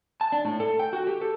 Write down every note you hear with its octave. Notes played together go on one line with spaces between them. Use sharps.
A5
D4
A2
A4
G5
F#4
G4
A4